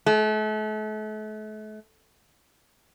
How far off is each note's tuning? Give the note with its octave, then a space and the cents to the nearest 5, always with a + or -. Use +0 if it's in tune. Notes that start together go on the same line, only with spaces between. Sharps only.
A3 -40